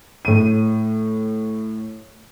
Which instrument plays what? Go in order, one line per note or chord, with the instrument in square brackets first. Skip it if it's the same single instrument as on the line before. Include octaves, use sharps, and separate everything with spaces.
[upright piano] A2 D#7